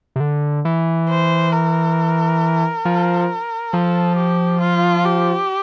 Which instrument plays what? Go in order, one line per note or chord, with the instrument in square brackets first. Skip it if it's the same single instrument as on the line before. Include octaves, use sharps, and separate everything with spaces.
[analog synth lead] C3
D3
E3
[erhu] C5
A#4
[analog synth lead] F3
[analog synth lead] F3 [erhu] A4
[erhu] G4
F4
G4